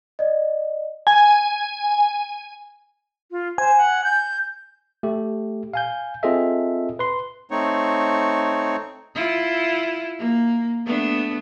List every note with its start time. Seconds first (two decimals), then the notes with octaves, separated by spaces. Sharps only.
0.19 D5 D#5
1.07 G#5
3.31 F4
3.58 C5 G#5
3.77 F#5
4.04 G6
5.03 A3 G4
5.74 F5 G#5 G6
6.23 C4 F4 G#4 A4 D#5 E5
6.99 B4 C6
7.51 A3 C4 D#4 C#5
9.15 E4 F4
10.19 A#3
10.86 A3 B3 D4